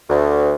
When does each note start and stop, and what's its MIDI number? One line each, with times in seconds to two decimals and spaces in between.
0.09 0.55 38